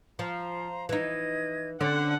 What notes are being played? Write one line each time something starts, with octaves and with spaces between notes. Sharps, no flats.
F3 C5 A#5
E3 D#4 D#5 G#6
D3 C4 C#4 F#5